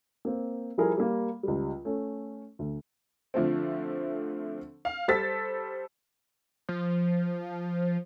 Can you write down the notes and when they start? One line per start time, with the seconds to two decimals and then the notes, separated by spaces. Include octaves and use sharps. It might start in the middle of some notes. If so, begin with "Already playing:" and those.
0.25 A#3 C4
0.78 F3 G3 E4 G#4 A#4
0.97 G3 A#3
1.43 C#2 G3
1.85 A3 C#4
2.59 D2
3.34 D3 F3 A3 C4
4.85 F5
5.08 G3 A4 C5 E6 A6 B6
6.69 F3